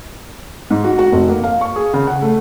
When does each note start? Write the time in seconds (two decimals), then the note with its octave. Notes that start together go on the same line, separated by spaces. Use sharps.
0.71 G#2
0.84 F#4
0.99 F#4
1.12 F1
1.29 A#3
1.44 F5
1.61 C#6
1.76 G#4
1.94 C#3
2.07 F#5
2.22 A3